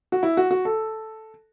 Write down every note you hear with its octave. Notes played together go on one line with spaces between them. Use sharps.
F#4
E4
F#4
F#4
A4